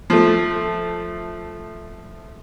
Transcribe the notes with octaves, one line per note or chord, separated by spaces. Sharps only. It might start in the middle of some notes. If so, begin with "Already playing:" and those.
F3 A3